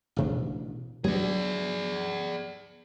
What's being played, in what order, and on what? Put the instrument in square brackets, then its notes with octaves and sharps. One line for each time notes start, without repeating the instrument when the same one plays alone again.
[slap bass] A1 B2 D4
[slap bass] F#3 B3 D4 [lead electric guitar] G#4 D5